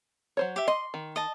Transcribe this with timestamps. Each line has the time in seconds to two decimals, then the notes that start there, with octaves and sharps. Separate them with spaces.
0.37 F#3 C5 C#5
0.56 G4 E5
0.68 D#5 C6
0.94 D#3
1.16 D#5 A5